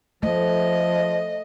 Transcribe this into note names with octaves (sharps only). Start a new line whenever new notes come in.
F3 A3 D#5